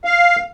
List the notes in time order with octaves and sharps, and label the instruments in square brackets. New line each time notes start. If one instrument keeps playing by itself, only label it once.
[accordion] F5